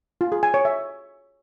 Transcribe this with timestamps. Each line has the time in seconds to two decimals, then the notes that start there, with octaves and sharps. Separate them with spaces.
0.21 F4
0.32 G#4
0.43 G#5
0.54 C#5
0.65 E5